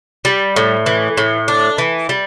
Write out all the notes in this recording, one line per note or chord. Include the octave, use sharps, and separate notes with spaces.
G3
A2
E3
A2
D4
E3
G3